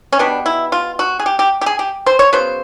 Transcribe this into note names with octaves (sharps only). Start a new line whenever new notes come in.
C#4
B2 G3 B3 D4
E4
F4
F#4
G#4
G4
G4
G4
G#4
G4
C5
C#5
C#3 F#3 B3 C5